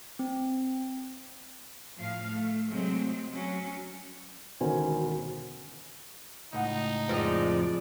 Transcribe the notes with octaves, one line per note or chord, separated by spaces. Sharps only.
C4
A2 F3 F5
A3
C3 F#3 G#3 A3 C4
F#3 C#4
E1 D2 D#3 C#4 C5 G#5
C#2 A2 D#4 F#5
F2 F3 G#3 D5